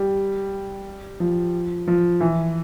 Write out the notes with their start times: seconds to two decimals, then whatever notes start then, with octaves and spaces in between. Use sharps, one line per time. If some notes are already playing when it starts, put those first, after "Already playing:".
Already playing: G3
1.20 F3
1.88 F3
2.20 E3